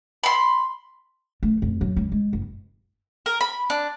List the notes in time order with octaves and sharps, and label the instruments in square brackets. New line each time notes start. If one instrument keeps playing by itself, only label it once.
[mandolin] B5 C6
[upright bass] A3
F2
F#2
C#2
G#3
F#1
[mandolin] A#4
B5
D4